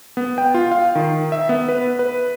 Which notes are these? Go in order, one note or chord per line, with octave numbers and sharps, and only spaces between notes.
B3
G5
F4
F5
D#3
E5
B3
B4
B4